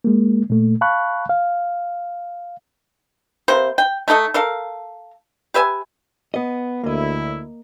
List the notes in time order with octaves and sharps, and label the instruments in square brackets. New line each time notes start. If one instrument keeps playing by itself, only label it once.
[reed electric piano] G#3 A#3
A#2 A3
F5 A5 B5 C#6 F#6
F5
[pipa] C3 A#3 B4 C5
G5
A3 D#4 A4 D#5
A4 A#4 F5
G4 B4 E5 G#5
[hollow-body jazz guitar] B3 D#5
[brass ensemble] D2 E4 [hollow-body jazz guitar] A#3 D#5